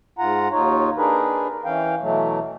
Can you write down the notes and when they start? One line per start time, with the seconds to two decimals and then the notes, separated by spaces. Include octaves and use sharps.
0.19 G#2 F4 F#5 A#5
0.52 D#2 D#4 F4 C#5
0.97 D4 D#4 G#4 A#4 B4
1.65 E3 C#4 F5 G5
2.01 B2 E3 F#3 A3